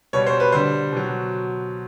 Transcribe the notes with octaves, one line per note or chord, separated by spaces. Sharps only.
B2 G3 C#5
C5
B4
D3 G3 C5
B2 F#3